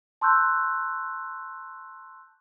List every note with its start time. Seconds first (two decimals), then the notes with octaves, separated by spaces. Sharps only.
0.21 A5 C6 C#6 E6 F#6 G6